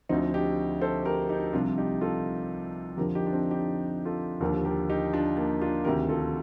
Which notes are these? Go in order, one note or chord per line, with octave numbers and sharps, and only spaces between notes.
D2 D3 F3 C4 D#4
D#4 G4
A4 C5
G4 A#4
D#4 G4
C2 C3 F3 D4 F4
D#4 G4
F4 A4
F2 D3 F3 G4 A#4
D#4 G4
D4
C4 D#4
D#4 G4
F4 A4
D#2 D3 F3 G4 A#4
G4 A#4
D#4 G4
D4 F4
A#3 D4
D4 F4
D2 C3 D#3 G4 A#4
F4 A4